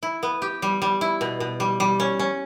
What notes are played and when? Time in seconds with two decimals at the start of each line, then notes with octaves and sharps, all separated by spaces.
0.03 E4
0.23 B3
0.42 G4
0.62 G3
0.82 G3
1.01 E4
1.21 B2
1.40 B2
1.60 G3
1.80 G3
2.00 C#4
2.19 C#4